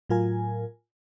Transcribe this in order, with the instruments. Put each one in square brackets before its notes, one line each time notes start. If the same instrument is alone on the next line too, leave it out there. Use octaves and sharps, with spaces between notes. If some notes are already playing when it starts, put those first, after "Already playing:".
[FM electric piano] A2 F#3 F4 A#4 G#5